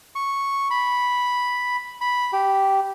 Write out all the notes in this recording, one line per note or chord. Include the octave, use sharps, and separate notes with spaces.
C#6
B5
B5
G4